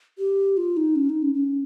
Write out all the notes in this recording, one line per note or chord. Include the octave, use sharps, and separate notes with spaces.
G4
F4
D#4
C#4
D#4
C#4
C#4